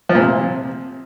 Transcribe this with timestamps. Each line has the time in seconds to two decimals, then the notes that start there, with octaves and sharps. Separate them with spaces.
0.09 F3
0.15 A#2
0.21 C3